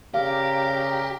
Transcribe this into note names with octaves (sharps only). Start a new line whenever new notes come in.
C#3 G4 A#4 D5 F5 A#5